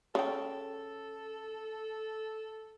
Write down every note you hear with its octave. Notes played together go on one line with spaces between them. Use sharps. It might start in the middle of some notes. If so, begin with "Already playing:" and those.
C#3 A4 G5